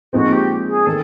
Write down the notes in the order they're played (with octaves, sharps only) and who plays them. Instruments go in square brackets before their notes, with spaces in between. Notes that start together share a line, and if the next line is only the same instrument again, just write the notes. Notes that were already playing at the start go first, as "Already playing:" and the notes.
[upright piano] A#2 F3 G#3 C4 D#4 [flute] F#4
[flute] G4
G#4
[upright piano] D#3 [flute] A4